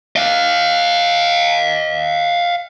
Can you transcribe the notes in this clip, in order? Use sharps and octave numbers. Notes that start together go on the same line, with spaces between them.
D#5 F5